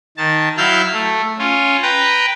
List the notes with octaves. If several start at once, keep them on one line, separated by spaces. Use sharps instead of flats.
D#3 A5
F#3 E4 F5 E6 F6 G6
A3
C#4 F4
B4 G5 A#5